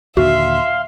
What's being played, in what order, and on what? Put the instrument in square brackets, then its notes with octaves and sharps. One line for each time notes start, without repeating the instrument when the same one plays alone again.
[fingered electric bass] D#2 A#2 D3 [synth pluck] F#4 [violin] E5 [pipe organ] F5 C6